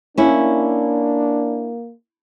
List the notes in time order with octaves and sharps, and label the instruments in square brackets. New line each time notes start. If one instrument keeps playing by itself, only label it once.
[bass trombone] A#3 [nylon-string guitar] C#4 E4 [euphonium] D4